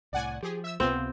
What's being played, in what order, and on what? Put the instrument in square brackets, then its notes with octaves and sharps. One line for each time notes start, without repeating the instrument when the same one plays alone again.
[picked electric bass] C2 A2 [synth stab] D5 F#5 G#5
[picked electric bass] F3 [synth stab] G4 G#4
[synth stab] E5 E6
[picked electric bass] C#2 C3 [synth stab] B3 F4 [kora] C4